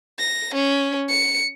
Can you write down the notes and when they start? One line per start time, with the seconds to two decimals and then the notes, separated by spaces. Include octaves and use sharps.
0.19 A#6
0.55 C#4
1.09 C#7